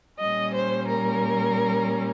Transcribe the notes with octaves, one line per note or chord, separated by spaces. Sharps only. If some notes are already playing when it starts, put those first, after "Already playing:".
A#2 G3 C#4 D#5
C5
A#4